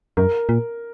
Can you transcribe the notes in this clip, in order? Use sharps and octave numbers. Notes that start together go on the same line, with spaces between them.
F#2 A#4
A#2